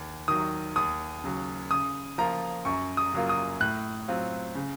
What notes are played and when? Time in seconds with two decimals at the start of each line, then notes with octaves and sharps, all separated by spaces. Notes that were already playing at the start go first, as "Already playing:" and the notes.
Already playing: D#2
0.28 D#3 F#3 D#6
0.76 D#2 D#6
1.24 C#3 F#3
1.70 C#3 D#6
2.18 F3 A#3 F4 A#5
2.65 F#2 C#6
2.97 D#6
3.13 C#3 F#3 A#3 F4
3.29 D#6
3.60 A2 F#6
4.08 F#3 C4 F4
4.55 C#3